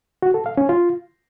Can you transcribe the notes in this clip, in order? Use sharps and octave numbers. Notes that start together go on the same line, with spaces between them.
F#4
A4
F5
C#4
F4